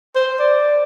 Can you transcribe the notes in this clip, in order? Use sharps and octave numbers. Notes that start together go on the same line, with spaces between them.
C5
D5